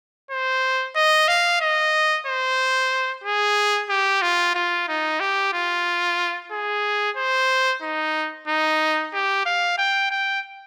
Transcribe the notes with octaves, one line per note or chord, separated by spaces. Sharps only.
C5
D#5
F5
D#5
C5
G#4
G4
F4
F4
D#4
G4
F4
G#4
C5
D#4
D#4
G4
F5
G5
G5